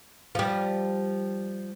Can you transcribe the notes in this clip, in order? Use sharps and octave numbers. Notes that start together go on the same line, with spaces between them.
F3 G3